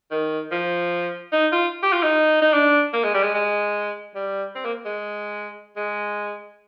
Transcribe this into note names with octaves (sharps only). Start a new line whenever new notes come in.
D#3
F3
D#4
F4
G4
F4
D#4
D#4
D4
A#3
G#3
G3
G#3
G#3
G3
C4
A#3
G#3
G#3